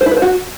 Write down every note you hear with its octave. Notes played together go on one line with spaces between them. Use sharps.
C5
E4
B4
C5
F#4